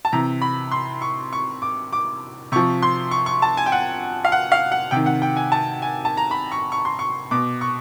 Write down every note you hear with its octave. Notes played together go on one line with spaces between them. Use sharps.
A5
C3 E3 A#5
B5
C6
C#6
C#6
D6
D6
C3 F3 C#6
C6
C#6
C#6
A5
G#5
G5
F#5
F5
F#5
F5
F#5
C3 D#3 G5
F#5
G5
G#5
A5
G#5
A5
A#5
B5
C#6
C#6
C6
C#6
B2 D6
C#6